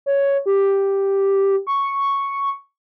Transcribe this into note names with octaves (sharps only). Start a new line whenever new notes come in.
C#5
G4
C#6